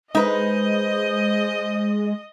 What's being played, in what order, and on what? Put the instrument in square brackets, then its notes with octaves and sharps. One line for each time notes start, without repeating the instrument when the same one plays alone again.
[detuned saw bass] G#3 [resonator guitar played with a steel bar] D#4 B4 [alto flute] C5 [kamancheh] D#5 D#6